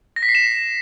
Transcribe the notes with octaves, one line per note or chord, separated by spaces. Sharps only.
A#6
B6
C7
E7